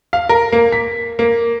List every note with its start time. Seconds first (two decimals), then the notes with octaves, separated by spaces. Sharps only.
0.13 F5
0.29 A#4
0.52 A#3
0.72 B6
1.19 A#3